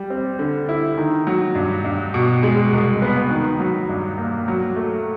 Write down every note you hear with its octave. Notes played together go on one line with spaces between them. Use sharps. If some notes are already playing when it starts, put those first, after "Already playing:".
Already playing: G3
C4
D3
E4
D#3
F#3
G2
G2
B2
G#3
C2
B3
D#3
F#3
G2
A#3
F#3
A3